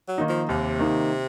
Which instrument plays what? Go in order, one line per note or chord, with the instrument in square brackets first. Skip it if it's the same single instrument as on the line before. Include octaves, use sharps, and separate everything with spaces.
[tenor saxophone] F#3
[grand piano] D#3 A#3 D#4
[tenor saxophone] F3
[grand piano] D#2 [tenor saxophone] C3
[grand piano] D#3 A#3 D#4